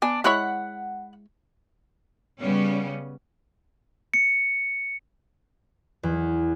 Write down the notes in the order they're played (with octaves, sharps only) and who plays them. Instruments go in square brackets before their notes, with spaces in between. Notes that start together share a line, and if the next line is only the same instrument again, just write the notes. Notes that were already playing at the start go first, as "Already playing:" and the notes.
[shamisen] B3 G#5 [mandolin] D4
[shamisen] G#3 E4 C#5 [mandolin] F#5 B5 F#6
[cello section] C#3 G3 B3 C#4
[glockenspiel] C#7
[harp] E2